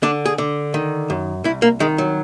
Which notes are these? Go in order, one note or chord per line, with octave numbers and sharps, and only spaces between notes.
D3 D4
G#4
D3
D#3
F#2
C2 E4
A#3
D#3 G#3
F#3